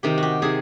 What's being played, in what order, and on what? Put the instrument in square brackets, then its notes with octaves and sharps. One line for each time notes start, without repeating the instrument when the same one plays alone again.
[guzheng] C3 D#3 G4
F#4 G4
C3 D#3 G#4